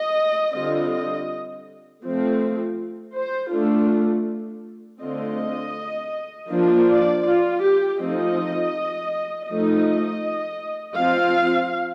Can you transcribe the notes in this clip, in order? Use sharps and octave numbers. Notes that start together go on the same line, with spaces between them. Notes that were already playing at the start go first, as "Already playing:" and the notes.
Already playing: D#5
D3 G3 C4 F4 D#5
D#5
F3 A3 C4
C5
A3 D4 F4
D3 A3 C4 F4 D#5
F3 A#3 D4 F4
D5
F4
G4
F3 A3 C4 D#4 D#5
F3 A3 D#4 D#5
F3 C4 F4 F5